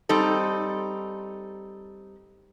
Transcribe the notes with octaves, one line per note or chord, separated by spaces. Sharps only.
G3 C4 D#4 A4